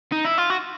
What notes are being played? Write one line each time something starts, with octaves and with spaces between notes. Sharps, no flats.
D#4
E4
F4
F#4